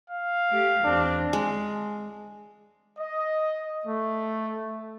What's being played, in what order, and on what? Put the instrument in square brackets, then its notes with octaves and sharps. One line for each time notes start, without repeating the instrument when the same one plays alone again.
[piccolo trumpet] F5
[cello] A3 G4
[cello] E2 C4 [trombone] D4
[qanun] G#3
[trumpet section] D#5
A3